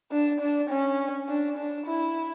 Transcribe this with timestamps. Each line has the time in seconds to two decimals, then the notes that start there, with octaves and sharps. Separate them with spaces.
0.12 D4
0.40 D4
0.70 C#4
1.28 D4
1.58 D4
1.86 E4